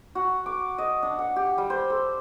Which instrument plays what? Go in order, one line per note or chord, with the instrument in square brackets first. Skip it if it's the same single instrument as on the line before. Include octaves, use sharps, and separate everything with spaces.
[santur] F#4
D6
D#5
D4
F#5
G4
G3
C5
A4